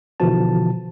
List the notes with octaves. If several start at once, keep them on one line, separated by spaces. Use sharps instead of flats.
B2 D3 E3 F3 F#4 A5